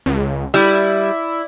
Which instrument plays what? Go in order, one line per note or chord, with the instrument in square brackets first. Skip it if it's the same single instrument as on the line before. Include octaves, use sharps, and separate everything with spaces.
[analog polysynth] C#2
[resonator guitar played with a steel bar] G3 [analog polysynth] E4